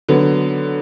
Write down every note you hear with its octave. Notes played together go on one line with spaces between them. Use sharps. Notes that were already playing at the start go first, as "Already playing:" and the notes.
D3 F#3 B3